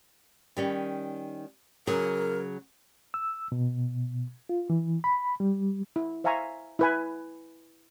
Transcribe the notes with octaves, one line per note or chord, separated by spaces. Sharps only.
D#3 G3 C#4
C#3 F#3 G#4 A#4
E6
B2
F4
E3
B5
G3
E4
C5 E5 F5 G#5 A#5 C#6
E4 B4 G#5